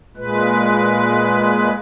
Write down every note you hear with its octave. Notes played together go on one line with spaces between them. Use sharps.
A#2 G#3 B4